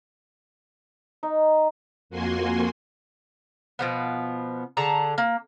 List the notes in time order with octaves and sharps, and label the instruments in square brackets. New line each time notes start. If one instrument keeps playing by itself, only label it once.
[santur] D#4
[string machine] F2 A#3 F#4 G#5 C6
[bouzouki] B2 F3 B3
D3 G#4 A5 A#5
A#3